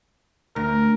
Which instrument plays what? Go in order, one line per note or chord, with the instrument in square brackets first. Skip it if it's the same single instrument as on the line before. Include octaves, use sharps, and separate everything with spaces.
[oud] D2 [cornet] A#4